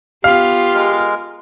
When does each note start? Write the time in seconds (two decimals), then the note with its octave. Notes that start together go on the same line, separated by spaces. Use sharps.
0.24 B3 F4 G4 F5
0.74 G#3 A#4